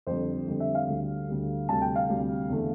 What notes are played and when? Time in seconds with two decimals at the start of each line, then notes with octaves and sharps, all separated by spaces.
0.07 F2 D3 G3 C5
0.48 F2 D3 G3
0.60 E5
0.75 F5
0.88 D2 D3 G3
1.29 D2 D3 G3
1.69 D2 C3 G3 A5
1.82 G5
1.96 F5
2.09 D2 C3 G3
2.49 E2 D3 A3